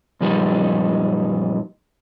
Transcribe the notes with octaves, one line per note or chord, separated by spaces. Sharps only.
F#2 A#2 F3 G3 D#4